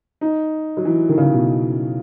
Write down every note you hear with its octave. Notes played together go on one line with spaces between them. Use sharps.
D#4
F#3
E3
D#3
C#3
B2